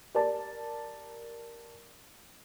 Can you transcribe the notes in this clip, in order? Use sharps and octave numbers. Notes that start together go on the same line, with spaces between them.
G4 A#4 D5 A5